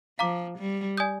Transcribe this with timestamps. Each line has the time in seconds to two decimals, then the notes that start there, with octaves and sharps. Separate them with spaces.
0.19 F3 F5 A#5 D6
0.58 G3
0.98 D5 G#5 D#6 G6